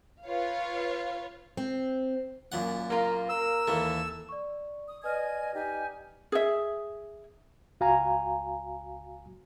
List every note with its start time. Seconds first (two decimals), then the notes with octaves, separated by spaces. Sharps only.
0.24 F4 B4 C#5 F5
1.57 C4
2.52 F#2 A#2 F#5
2.90 A#3 F4 A#4
3.29 A#4 E6
3.68 D#2 E3 A4
4.29 D5 C#6
4.88 D#6
5.04 B4 D5 D#5 G#5 F6 G#6
5.54 D#4 G4 G#5
6.32 G#4 E5
7.80 C#2 F#4 F5 G#5 A#5